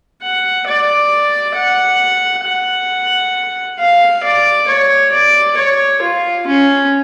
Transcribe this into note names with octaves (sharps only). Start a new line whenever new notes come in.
F#5
D5
F#5
F#5
F5
D5
C#5
D5
C#5
F4
C#4